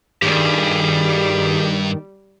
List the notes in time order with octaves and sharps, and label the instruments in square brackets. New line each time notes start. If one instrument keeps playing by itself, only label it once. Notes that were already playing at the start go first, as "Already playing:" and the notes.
[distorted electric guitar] G2 [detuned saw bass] D#3 [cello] G3 [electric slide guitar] G4 G#4